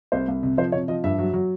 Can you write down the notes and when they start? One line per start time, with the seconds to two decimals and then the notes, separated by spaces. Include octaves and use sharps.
0.12 C2 C5
0.28 C2
0.43 C3
0.57 F3 C5
0.72 C3 C#5
0.88 F3 D#5
1.04 G2 E5
1.18 F#3
1.33 F#3